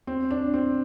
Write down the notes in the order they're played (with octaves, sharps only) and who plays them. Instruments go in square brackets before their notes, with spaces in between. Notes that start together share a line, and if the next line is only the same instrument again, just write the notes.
[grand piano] C4
D4
C4